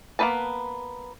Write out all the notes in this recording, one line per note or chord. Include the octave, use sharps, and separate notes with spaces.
A#3 B3 D#4 B4 A5